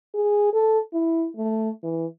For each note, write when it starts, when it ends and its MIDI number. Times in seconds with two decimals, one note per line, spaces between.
0.15 0.53 68
0.54 0.79 69
0.94 1.28 64
1.37 1.70 57
1.83 2.06 52